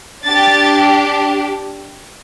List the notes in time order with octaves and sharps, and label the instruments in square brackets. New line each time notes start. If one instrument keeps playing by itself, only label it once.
[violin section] D4 G4 A6